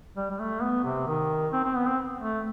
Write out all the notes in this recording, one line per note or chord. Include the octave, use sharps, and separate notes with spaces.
G3
G3
A3
B3
C3
D#3
C4
C4
B3
C4
A3